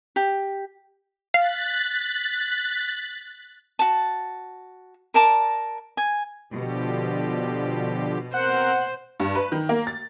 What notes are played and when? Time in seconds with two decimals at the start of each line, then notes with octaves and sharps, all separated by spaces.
0.16 G4
1.34 F5 F#6 A6 B6
3.79 F#4 A5
5.14 A#4 D5 A5 A#5
5.97 G#5
6.53 B2 D3 F3 G4
8.34 C4 A#4 C5 F#5
9.20 G2
9.35 B4
9.52 D#3
9.69 A#3
9.87 A6